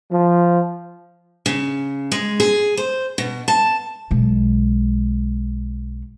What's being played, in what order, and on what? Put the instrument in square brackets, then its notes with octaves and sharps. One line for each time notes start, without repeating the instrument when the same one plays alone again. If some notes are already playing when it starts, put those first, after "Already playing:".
[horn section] F3
[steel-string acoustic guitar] C#3
G#3
G#4
C5
B2
A5
[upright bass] B1 G#3